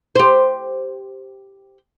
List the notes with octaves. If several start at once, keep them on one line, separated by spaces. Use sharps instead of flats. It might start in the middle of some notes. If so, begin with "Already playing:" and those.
G4 C5